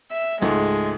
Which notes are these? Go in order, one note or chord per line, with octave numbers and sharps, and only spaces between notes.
E5
C#2 G#2 G#3 A3